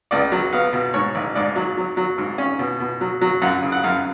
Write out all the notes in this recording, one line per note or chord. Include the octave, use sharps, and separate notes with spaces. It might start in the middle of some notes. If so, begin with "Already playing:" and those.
C#2 D5
F#3
B3 F5
B2
G#2 C#5
A1
G#2 D5
F#3
F#3
F#3
G#2
C#4
B2
B2
F#3
F#3
F#2 F#5
C#3
F#5
F#2 F5